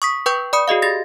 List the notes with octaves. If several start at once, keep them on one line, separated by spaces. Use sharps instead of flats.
C#6 D#6 B6
B4 G5 C#6 G6
D5 B5 D#6 C#7
F#4 G#4 D#5 F5
G4 A6 A#6